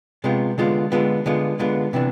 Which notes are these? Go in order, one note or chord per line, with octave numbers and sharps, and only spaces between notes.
C3 G#3 B3 F4
D3 G#3 B3 F4
D3 G#3 B3 F4
D3 G#3 B3 F4
D3 G#3 B3 F4
C3 E3 B3 D4